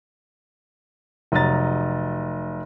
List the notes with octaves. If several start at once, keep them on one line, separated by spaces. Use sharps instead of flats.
F1 F#3 D#5 A#5 A6